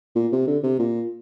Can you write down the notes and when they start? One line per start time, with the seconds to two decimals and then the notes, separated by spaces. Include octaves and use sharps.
0.16 A#2
0.32 C3
0.47 D3
0.63 C3
0.79 A#2